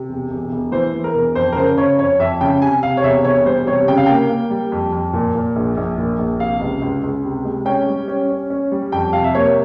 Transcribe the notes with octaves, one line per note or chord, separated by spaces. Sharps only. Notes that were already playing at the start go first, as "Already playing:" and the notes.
Already playing: C3
E1
E1
E1
E3 C5
E3
A#4
E1
F2 C5
A#4
C#3 C5
C#3 C#5
F2 C#5
F2 E5
C#3 G5
C3 G#5
C3 F5
C#5
E1 E5
E1 C#5
G3 C5
C3 C#5
C#3 G5
F5
A#3 G5
A#3
G3
F2
F2
A#2
A#2
A#1
A#1
A#2
A#1
C3 F5
C#2
C#2
C#2
C3
G#3
C#4 G5
G3
C#4
C#4
C#4
G3
F2 G5
C3 F5
E5
A#3 C#5